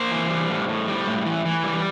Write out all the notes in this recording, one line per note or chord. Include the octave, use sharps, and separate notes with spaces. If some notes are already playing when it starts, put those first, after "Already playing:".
Already playing: A#3 C5
E3
G3
A2
A2
G3
A2
E3
E3
G3